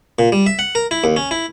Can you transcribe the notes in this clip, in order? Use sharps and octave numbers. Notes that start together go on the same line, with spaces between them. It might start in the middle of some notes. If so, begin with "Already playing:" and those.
A#2
G3
E5
F#5
A#4
E4
D#2
C#4
E4